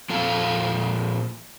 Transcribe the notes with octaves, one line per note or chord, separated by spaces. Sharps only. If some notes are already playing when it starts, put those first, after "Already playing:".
A#2 F3 A4 F5